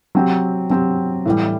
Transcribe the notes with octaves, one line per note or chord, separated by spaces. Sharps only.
F#3 C4 G4
F#3 C4 G4
A2 E3 G3